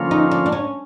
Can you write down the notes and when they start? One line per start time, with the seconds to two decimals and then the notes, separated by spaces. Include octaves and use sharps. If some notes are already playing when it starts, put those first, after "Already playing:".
Already playing: D3 F3 A#3 C#4 F4
0.11 D#4
0.31 D4
0.46 D4
0.52 C#4